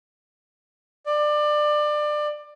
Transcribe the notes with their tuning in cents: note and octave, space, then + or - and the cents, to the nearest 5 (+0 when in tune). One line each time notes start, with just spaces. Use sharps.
D5 +25